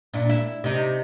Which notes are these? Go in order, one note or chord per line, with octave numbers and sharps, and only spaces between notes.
A#2 D4 E4
E4
C3 D#4